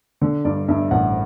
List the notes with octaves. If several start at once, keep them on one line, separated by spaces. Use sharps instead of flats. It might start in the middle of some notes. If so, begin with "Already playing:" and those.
D3
G2 D5
G2 E5
A1 F#5